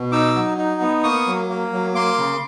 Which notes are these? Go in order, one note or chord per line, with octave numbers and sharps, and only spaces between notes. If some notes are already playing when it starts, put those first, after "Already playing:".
Already playing: B2
D#4 D6 E6
F#3
D#4
B3
A#3 C#6 D#6
F#3
A#3
F#3
A#3 C6 D6
C#3